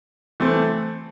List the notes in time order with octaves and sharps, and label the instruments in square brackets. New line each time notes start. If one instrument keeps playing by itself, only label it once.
[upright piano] E3 A3 C4